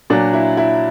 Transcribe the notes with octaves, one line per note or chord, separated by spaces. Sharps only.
A#2 F#3 D4
E4
E4